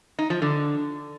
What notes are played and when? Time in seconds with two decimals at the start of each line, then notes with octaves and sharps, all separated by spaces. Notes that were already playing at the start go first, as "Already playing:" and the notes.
0.19 D#4
0.30 F3
0.42 D3